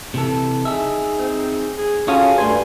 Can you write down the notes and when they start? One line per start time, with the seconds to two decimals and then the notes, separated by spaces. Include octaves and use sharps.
0.14 C3 E3 A4
0.65 D#4 G#4 E5
1.19 C4
1.78 G#4
2.08 C#4 F4 F#4 G#4 A4
2.38 G2 A3 C5 G#5